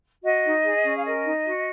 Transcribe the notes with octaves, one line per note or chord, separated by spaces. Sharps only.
F#4 D#5
D#4
G#4
C#4
F5
A#4 D#5
D#4
F#4